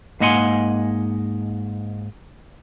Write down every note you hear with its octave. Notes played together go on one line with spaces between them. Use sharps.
G#2 A#3 D#5 F#5 G#5 C6